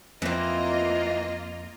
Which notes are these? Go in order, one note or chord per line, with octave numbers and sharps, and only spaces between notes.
F2 E3 A#3 C4 F4 D#5